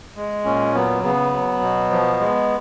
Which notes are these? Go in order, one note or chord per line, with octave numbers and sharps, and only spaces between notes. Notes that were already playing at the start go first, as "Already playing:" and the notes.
G#3
A#2 C#4
F#3 B3
C#3 B3
F#3
B2
F3
G#3